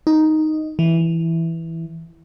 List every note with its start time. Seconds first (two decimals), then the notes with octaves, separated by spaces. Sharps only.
0.07 D#4
0.79 E3